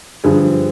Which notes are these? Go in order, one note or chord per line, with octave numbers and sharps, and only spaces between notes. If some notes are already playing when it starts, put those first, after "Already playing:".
G2 D3 F3 G#4